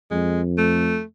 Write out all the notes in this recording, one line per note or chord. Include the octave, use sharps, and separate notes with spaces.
F2 G#3
A3